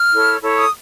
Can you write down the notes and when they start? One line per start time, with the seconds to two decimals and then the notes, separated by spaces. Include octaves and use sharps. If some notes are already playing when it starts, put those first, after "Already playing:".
Already playing: F6
0.13 E4 A4 C#5
0.42 E4 A4 C#5
0.57 D#6